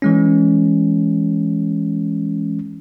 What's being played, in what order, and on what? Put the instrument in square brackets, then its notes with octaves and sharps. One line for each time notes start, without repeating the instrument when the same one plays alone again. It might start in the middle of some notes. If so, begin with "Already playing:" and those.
[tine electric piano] E3 G#3 C#4